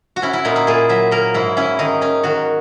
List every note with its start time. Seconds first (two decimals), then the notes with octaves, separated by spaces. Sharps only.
0.16 F#4
0.22 C#4 E4
0.33 E4
0.45 A#2 D#4
0.56 E4
0.67 A#2 G#4
0.89 F#3 E5
1.11 A#3 A#4
1.34 G#2 E4
1.57 C#4 E4
1.79 D#3 D#4
2.01 C#4 D#4
2.23 D#3 F#4